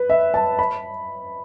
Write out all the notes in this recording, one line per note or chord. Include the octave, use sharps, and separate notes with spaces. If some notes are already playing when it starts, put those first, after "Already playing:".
Already playing: B4
E5
A5
B5